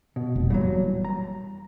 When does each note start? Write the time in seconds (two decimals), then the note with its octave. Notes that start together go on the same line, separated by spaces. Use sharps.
0.16 B2
0.36 F1
0.50 A#2 E3 F#3 G3
1.05 A#5